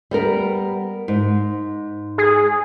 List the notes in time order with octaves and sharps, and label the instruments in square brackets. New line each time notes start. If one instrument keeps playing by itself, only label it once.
[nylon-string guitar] G3 B3 A#4
G#2
[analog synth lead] G#4